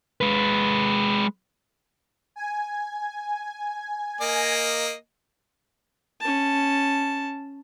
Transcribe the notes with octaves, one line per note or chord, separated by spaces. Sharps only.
G#3 B4
G#5
A#3 D#5
C#4 A5